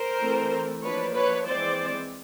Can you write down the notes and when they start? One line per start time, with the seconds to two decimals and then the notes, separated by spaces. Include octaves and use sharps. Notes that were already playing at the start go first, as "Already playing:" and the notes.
Already playing: A#4 C5
0.20 E3 A3 C4
0.82 F3 A#3 D4 B4 C#5
1.14 B4 C#5
1.45 E3 G#3 C4 C5 D5